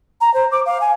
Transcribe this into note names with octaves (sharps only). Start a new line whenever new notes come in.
A#5
C5
D6
F5
G#5